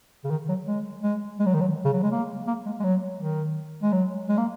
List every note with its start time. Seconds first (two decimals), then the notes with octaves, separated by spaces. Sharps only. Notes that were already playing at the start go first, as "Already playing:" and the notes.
0.24 C#3
0.31 D#3
0.49 F#3
0.67 G#3
1.03 G#3
1.40 G#3
1.46 F#3
1.54 D#3
1.61 F#3
1.85 C#3
1.93 F#3
2.03 G#3
2.12 A#3
2.47 A#3
2.66 G#3
2.80 G#3
2.84 F#3
3.20 D#3
3.83 G#3
3.93 F#3
4.29 G#3
4.37 A#3